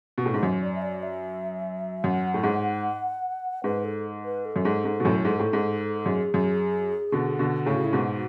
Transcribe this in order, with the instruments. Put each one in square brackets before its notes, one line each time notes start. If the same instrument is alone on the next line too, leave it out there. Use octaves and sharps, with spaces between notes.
[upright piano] B2
A2
G#2
F#2
[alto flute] D5
E5
D5
E5
[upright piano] F#2 [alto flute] F#5
[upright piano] A2
G#2
[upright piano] G#2 [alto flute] B4
[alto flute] A4
B4
A4
[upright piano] F#2
G#2
G#2
B2
F#2 A2
G#2
A2
G#2
[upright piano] F#2 [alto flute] G#4
[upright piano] F#2
B2 D3
B2 D3
[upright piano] A2 C#3 [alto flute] G#4
[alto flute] F#4
E4
[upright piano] G#2 B2 [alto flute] F#4